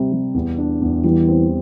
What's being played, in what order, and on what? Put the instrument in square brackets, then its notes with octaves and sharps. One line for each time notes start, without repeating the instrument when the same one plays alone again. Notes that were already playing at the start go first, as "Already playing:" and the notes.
Already playing: [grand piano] C3 G3
G3
E2
D4
E2
[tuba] E3 [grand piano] G3
[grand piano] C4